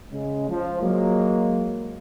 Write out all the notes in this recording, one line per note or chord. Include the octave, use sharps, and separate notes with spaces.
C#3 G#3
F3
F#3 G#3 A#3